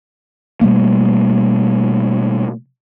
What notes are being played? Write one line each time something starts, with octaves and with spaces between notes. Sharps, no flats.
B2 G3 A3 A#3